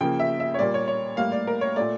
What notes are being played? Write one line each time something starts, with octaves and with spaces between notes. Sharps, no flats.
C#3 F3 A#3 G5
E5
E5
C#5
A#2 G3 A#3 D5
C#5
C#5
A2 G3 A#3 F5
D5
A#4
C#5
A#2 A3 D5